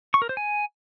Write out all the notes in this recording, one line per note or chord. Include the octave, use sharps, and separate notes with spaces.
C#6
A#4
C5
G#5